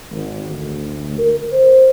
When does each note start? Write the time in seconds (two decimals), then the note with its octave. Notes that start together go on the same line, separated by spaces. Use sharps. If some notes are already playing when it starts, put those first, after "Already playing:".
0.10 G#1
0.50 D2
1.18 A#4
1.52 C5